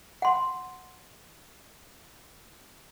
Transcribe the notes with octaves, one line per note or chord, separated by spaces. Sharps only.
F#5 C6